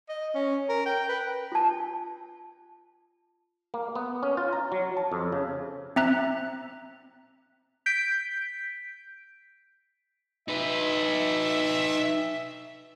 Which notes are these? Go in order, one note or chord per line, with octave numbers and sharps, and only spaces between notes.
D#5
C#4
A#4
G5
B4
F4 A5
A#3
B3
C#4
F4
A#5
F#3
A5
F2
C#3
C4 E5 A#5 F#6
G6 B6 D7
D#4 B4 E5